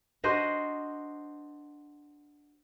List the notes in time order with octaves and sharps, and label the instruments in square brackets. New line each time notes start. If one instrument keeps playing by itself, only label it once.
[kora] D4 F#4 C5 D#5